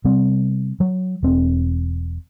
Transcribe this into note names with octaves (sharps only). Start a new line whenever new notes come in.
C3 G3 B3 C4
F#3
E1 C4